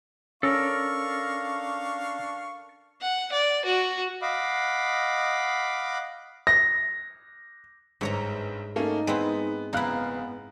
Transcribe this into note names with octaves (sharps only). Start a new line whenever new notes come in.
C#4 D4 A4 A#4 F5 C#6
F#5
D5
F#4
D#5 F5 F#5 B5 D6
A#6
G1 G#2 C#5 A#5
A3 A#3 C#4 D#4
G#3 B3 C4 E4
F#1 B3 D#4 E4 F5 F#6